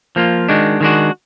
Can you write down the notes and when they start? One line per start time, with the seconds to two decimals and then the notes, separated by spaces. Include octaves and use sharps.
0.16 F3 A#3 F4
0.49 D#3 G#3 D4 F#4
0.81 D#3 G#3 D4 F#4